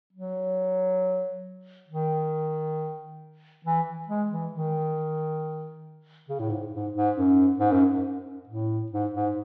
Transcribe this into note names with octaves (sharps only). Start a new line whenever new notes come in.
F#3
D#3
E3
G#3
E3
D#3
C#3
A2
G#2
G#2
G#2
F#2
G#2
F#2
F#2
A2
G#2
G#2